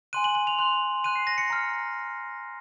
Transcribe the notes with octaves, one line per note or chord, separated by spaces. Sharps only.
G#5 C6 F#6 D#7
F#7
F#7
F7
C6 F#6 F7
C6 F#6 D#7
C7
A#6
C#7
A#5 F6